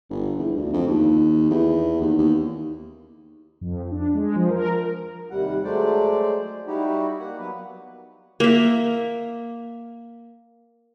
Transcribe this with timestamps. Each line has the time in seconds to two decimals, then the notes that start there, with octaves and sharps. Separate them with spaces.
0.10 G1
0.38 E2
0.56 D2
0.73 F2
0.87 D#2
1.50 E2
2.01 D#2
2.18 D#2
3.61 F2
3.92 D4
4.14 G#3
4.36 F3
4.50 A#4
5.31 D#2 C3 G3 F#5
5.64 F#3 G#3 A3 C5 D5
6.67 G3 D#4 E4 F#4 G4
7.19 A#3 F#5
7.38 F#3 B3 B4
8.40 A#3 E5